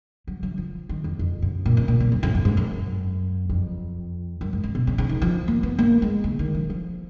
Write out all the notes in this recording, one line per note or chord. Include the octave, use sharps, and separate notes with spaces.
F#3
F#3
F3
D#3
F2
F2
F#2
A#2
C#3
A#2
A#2
F#2
F2
F#2
G#2
F#2
F2
F#2
G#2
C#3
B2
C#3
C#3
D#3
F3
A#3
B3
A#3
G#3
C#3
D#3
F3
F3